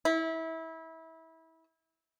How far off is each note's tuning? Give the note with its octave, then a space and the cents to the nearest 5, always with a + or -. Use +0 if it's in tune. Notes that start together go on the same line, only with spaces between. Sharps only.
E4 -25